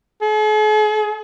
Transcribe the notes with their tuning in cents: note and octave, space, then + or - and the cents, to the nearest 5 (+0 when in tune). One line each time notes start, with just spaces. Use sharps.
G#4 +45